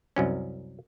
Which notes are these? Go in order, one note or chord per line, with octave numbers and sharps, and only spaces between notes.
C2 F#2 C#4